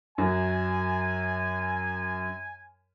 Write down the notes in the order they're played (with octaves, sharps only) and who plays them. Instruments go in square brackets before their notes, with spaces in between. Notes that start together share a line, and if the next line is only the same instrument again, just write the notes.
[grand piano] F#2 F#3 [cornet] G#5